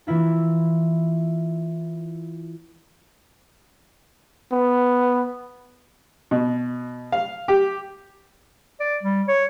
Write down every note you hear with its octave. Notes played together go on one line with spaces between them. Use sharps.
E3 A#3 E4 F4
B3
B2
F5
G4
D5
G3
C#5